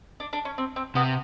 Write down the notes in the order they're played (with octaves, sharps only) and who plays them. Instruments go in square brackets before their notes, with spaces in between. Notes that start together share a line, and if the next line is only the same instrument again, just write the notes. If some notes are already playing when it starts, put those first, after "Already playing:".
[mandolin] D4
D4
C#4
C4
C4
[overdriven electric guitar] C3 [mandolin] B3